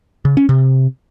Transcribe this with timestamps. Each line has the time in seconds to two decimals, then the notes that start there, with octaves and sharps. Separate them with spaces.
0.25 C#3
0.37 C#4
0.49 C3